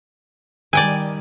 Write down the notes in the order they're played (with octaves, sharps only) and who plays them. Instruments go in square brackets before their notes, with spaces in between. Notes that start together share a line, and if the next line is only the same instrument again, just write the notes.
[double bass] D#3 G3 [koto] D5 G5 G#5